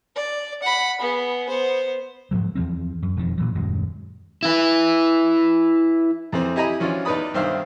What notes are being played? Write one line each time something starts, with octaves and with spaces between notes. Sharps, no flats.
D5
F#5 B5
B3 G#4
B3 C5
G#2 F3 F#3
E2 E3 F3 C4
F#2
E1 F2 D#3 F3
A#2 E3 F#3
D#1 F#2 F#3 G#3
E4 B4
F2 E3 C4
E4 G4 D#5 G#5 A#5 B5
E3 F3 C#4 D4 F4 F#4
E2 D#4 B4 D5 B5 D#6
B1 G2 D#3 C5 E5 F5